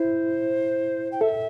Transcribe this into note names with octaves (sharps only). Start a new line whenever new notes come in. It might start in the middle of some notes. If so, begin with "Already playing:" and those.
Already playing: E4 C5
G5
A4 E5